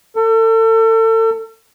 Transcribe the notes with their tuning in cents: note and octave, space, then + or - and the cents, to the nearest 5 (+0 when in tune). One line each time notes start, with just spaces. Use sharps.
A4 +35